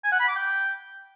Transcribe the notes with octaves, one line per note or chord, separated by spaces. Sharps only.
G#5
F#5
B5
D6
G5